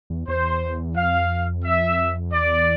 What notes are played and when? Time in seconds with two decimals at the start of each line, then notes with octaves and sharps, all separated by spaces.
0.10 E2
0.28 E2 C5
0.96 F2 F5
1.64 E5
2.33 E2 D5